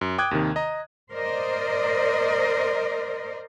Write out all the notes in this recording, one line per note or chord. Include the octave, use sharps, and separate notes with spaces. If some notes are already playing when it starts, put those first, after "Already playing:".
F#2
G5 D6 D#6 F#6 G#6
D#2 C3 D#3
D#5 A#5
A#4 C5 D5 D#5